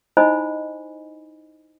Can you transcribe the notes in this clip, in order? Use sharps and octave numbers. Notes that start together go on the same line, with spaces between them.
D#4 E4 C5 D#5 G#5 B5